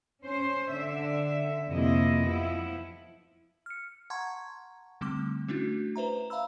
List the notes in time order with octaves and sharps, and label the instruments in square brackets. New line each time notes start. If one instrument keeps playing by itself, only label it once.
[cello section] C#4 C5
D3 E5
F2 C3 A#3 E4 D#5
F3 B3 E4
[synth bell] F6 C#7
F#5 A5 A#5 C6 C#6 G#6
D3 G3 A3 C4 D6
A3 C#4 D4 E4 F#4
B4 C5 E5 A#5
E5 F5 A#5 B5 E6